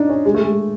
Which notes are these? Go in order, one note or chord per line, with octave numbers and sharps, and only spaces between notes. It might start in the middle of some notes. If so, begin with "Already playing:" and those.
Already playing: D4 D#4
C#4
G#3
A3
G#3